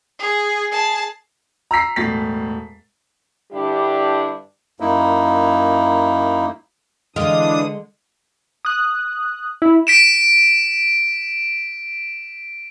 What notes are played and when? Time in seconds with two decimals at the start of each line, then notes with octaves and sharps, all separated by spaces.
0.19 G#4
0.72 G#4 A5
1.71 A#5 E6 B6 C7
1.96 E1 A2 A6 B6
3.52 G2 D3 G3 D4 E4 G4
4.80 F#2 A#3 D#4 E4
7.16 D3 E3 G#3 D4 F4 D#5 D#6
8.65 D#6 F#6
9.62 E4
9.87 B6 D7 E7